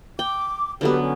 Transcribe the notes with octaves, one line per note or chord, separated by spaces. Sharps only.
G5 D6
D3 F#3 B3 G4 A4 B4
C#4